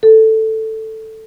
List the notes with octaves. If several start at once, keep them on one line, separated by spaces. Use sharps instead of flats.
A4